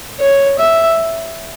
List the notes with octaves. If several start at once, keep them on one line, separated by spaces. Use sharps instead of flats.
C#5
E5